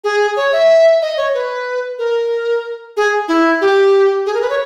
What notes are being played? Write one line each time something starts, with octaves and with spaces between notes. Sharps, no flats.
G#4
C#5
E5
D#5
C#5
B4
A#4
G#4
E4
G4
G#4
A#4
B4
C#5